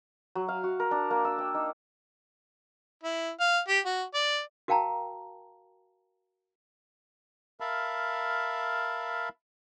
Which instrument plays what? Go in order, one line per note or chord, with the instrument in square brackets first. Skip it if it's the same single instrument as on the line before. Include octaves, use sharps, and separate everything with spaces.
[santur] F#3
F5
F#4
A#4
D4
A#3
E6
G5
D#4
[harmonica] E4
F5
G4
F#4
D5
[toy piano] F#4 A#4 F5 G5 A5 A#5
[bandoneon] A#4 E5 F5 A5 B5